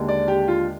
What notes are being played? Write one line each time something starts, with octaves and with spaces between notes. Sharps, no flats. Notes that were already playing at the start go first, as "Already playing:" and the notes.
Already playing: D#2 D3 G#3
D5
G4
F4